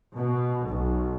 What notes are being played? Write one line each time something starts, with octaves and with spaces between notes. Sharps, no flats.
B2
B1